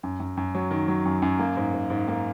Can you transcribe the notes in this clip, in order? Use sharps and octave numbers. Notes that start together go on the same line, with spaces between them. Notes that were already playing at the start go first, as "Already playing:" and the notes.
F#2
F#2
F#2
F#3
D#3
F#3
F#2
F#2
A#3
G#2
G#2
G#2
A#3